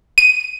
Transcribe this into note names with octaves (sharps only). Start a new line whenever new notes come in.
D#7